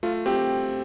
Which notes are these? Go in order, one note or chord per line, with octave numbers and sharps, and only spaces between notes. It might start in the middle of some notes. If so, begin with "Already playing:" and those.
A3 F4
C4 G4